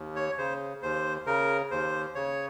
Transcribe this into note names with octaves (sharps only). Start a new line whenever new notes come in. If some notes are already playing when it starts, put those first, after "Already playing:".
Already playing: D#2
C#5
C#3 C5
D#2 C5
C#3 A#4
D#2 C5
C#3 C#5